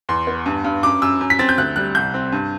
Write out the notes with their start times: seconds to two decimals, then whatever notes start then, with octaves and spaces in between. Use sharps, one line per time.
0.09 E2 C6
0.27 B3
0.46 G2
0.64 G2
0.83 F#2 D6
1.02 F#2 E6
1.21 F#2
1.30 B6
1.39 C4 A6
1.49 G6
1.58 D2 F#6
1.76 G3 F#6
1.95 C2 G6
2.14 C4
2.32 G2